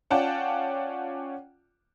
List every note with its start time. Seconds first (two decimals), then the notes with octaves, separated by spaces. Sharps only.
0.11 C#4 F4 D5 F#5 G5 A5